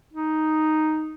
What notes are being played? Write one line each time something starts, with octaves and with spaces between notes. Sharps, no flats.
D#4